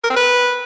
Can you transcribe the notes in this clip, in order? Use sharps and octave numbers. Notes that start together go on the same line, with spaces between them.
A#4
C4
B4